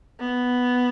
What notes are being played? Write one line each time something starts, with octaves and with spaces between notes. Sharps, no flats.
B3